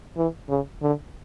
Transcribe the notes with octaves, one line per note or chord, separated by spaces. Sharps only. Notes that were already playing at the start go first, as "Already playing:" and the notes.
E3
C#3
D3